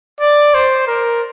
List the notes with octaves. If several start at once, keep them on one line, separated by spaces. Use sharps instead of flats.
D5
C5
A#4